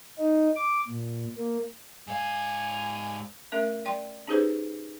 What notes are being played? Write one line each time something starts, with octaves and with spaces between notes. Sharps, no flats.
D#4
D6
A#2
A#3
G#2 F5 G#5
A3 C#4 A#4 E5
D5 G5 C6
C#4 D#4 G4 G#4 B4 C5